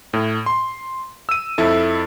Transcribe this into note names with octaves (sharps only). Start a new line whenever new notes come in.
A2
C6
E6 D#7
F2 E4 A4